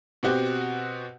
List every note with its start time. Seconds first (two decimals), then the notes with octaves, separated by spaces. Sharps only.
0.23 B2 C4 F#4 G4